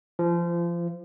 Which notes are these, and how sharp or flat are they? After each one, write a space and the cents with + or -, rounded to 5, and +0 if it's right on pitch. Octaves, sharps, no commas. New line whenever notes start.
F3 -30